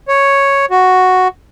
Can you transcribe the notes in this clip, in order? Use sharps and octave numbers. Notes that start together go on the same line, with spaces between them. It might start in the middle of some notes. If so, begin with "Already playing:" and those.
C#5
F#4